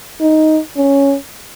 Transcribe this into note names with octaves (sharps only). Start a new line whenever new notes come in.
D#4
C#4